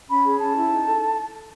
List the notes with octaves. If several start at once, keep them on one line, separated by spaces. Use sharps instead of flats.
C#4 B5
G#4
C#4 A5
E4
D#4
A4